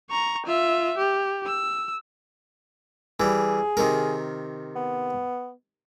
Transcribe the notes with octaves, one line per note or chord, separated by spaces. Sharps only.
A#5 C#6
F4 E5
G4
E6
E3 G3 G#4
C3 D#3 A#4
B3